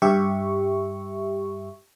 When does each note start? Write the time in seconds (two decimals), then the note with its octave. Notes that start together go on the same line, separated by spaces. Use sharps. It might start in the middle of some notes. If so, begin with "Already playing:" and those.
0.02 G2 G4 E5 C#6